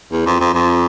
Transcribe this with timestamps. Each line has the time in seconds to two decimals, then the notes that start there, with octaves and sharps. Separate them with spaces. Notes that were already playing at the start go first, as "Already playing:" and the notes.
0.12 E2
0.26 F2
0.40 F2
0.54 F2